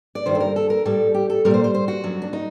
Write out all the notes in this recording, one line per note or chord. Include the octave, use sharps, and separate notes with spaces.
D5
G2 D#3 G3 C5
A4
A#4
A4
A#4
A2 G3 A4
G4
A4
A#2 G3 A#4
C5
C5
C5
F#4
F#2 F#3
D4
D#4